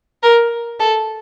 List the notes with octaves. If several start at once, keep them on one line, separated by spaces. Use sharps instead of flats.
A#4
A4